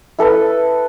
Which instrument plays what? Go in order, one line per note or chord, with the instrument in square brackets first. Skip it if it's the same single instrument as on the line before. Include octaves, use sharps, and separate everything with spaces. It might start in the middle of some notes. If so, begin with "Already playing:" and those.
[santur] E4 A4 B4 D#6